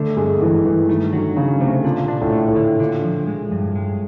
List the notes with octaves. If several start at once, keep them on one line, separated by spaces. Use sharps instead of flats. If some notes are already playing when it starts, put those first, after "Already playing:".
Already playing: D3 A3
G2 G#3
G2 E3
G2 E3
D#3 A3
D3 F#3
C#3 F#3
C3 A3
A#2 D3
A#2 D4
A2
A3
A2
D3
A#2 D3
F3
G#3
G2
G#3